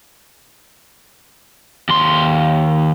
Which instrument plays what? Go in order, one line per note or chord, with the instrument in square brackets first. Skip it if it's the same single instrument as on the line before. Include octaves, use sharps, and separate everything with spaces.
[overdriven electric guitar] D#2 C6